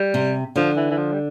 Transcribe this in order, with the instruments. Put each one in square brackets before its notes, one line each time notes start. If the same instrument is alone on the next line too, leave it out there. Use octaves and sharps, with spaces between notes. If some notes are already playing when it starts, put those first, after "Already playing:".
Already playing: [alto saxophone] G3
[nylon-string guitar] C3
[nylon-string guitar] D3 [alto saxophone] F3
[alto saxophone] E3
E3
F3
G3